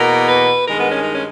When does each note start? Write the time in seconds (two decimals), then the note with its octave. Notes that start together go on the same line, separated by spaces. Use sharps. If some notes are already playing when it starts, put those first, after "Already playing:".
Already playing: E2 B2 A#3 A#4
0.29 B4
0.66 G2 D#3 G#3 A#4
0.79 B3
0.92 C#4
1.04 D#4
1.14 C#4